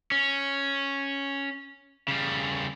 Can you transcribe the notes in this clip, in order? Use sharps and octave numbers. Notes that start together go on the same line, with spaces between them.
C#4
C#3 G3